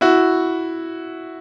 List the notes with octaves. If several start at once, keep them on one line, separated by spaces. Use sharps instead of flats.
E4 F#4